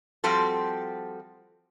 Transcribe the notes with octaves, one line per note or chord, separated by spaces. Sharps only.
F3 G3 C4 F#4 A4